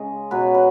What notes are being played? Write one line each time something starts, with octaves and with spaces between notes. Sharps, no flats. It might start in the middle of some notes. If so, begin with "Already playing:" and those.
Already playing: C#3 G#3 D#5
B2 F#3 B4
B4